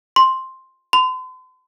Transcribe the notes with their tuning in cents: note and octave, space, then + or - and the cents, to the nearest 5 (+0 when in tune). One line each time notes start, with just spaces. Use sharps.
C6 +5
C6 -40